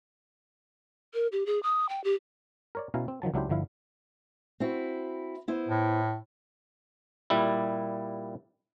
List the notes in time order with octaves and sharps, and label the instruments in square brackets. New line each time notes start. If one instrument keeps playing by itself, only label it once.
[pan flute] A#4
G4
G#4
D#6
G5
G4
[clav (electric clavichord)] A#4 C#5 D5
B2 C#4 E4 C#5 F5 A#5
C4
D#3 F3 F#3 A5
C#2 F#3 D4 E4 G4 C5
G1 D3 F3 E4 F5
[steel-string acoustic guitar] C4 E4 F#4
B3 E4 C5
[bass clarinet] A2
[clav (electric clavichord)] A#2 G3 E4